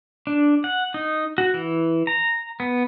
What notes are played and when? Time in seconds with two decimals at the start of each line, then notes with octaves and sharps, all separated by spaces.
0.27 D4
0.64 F#5
0.94 D#4
1.38 F#4
1.54 E3
2.07 A#5
2.60 B3